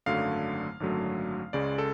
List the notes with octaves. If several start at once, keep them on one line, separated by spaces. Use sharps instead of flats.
G#1 F#2 D3 F#3 A3 F5
G#1 F#2 D3 F#3 A3
C#2 C#3 G#3 D5
A4